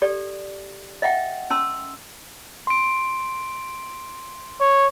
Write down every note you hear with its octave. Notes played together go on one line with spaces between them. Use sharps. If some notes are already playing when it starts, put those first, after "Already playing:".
G4 A4 D5
D#5 E5 F#5 G5
C#4 A5 C6 E6
C6 D7
C#5